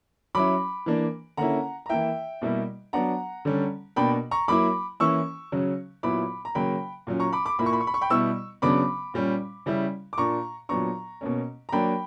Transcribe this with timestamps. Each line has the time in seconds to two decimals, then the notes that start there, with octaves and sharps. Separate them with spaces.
0.35 F#3 C#4 E4 B5 D6
0.86 E3 A#3 D4
1.37 D3 A#3 C#4 E4 F#5 A#5
1.86 A#5
1.89 E3 A#3 E4 E5 G5
2.42 B2 G3 A#3 E4
2.93 F#3 B3 D4 F#5 A#5
3.45 D3 G3 C#4
3.96 B2 A#3 D4 G5 B5
4.31 A#5 C#6
4.48 F#3 A#3 E4 B5 D6
5.00 E3 A#3 C#4 E4 C#6 E6
5.52 C#3 F#3 C#4
6.03 A#2 F#3 B3 E4 B5 D6
6.45 A#5
6.55 C#3 F#3 A#3 G5 B5
7.07 A#2 F#3 C#4
7.20 A#5 C#6
7.33 B5 D6
7.46 B5 D6
7.59 A#2 A#3 E4 B5
7.66 C#6
7.73 B5
7.80 C#6
7.87 B5
7.94 C#6
8.01 G5 B5
8.10 B2 G3 B3 E4 C#6 E6
8.62 C#3 F#3 B3 D4 B5 D6
9.14 A#2 G3 C#4
9.66 C#3 G3 C#4 E4
10.13 D6
10.18 A#2 A#3 D4 A#5 C#6
10.69 A#2 F#3 B3 D4 A#5 C#6
11.21 B2 A#3 C#4
11.69 A#5
11.72 F#3 A#3 D4 G5 B5